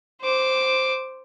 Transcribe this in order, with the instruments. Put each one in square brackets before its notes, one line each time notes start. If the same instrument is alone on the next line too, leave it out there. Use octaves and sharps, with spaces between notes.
[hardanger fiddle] C5 D6